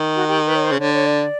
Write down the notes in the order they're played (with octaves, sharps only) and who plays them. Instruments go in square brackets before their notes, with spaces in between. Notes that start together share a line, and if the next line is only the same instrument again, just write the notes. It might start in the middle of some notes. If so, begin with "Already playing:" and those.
Already playing: [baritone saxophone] D#3
[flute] F#4
G4
B4
C#5
C5
[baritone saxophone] C#3
[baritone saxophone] D3 [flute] C#5
[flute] C#5
D5